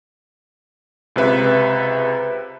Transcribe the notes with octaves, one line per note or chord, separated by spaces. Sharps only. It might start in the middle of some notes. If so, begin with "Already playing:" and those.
C#2 C3 B4 E5